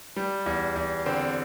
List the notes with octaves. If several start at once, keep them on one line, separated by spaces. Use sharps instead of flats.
G3
E2
E2
D3 C4